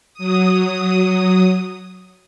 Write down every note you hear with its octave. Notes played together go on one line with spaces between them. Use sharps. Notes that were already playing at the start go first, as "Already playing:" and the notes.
F#3 D#6